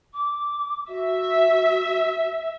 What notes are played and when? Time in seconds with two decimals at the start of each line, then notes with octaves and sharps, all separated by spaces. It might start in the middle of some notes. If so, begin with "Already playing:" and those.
0.14 D6
0.88 F#4 E5